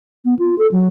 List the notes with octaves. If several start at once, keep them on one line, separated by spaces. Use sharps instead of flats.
B3
F4
A4
F#3